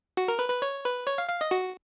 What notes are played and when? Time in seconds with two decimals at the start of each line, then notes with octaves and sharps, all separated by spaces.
0.17 F#4
0.28 A#4
0.39 B4
0.50 B4
0.62 C#5
0.85 B4
1.07 C#5
1.18 F5
1.29 F5
1.41 D#5
1.51 F#4